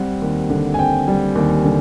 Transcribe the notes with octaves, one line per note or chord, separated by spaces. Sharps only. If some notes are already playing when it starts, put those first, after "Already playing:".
Already playing: G3 C4 F#5
D#2
D3
G#5
C4 G5
G3
D#2
D3